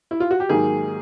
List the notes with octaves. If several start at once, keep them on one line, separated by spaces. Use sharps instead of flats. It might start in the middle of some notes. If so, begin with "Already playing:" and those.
E4
F4
F#4
G4
G#2 D#3 F#3 A#3 G#4